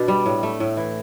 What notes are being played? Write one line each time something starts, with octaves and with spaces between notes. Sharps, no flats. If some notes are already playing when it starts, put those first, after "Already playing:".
Already playing: B2 D4
G3
A2
A3
A2
E3